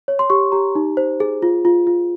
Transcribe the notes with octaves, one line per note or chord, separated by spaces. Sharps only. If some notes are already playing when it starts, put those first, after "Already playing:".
C#5
C6
G4 C#6
G4 A#5
D#4
C5
G#4
F4
F4
F4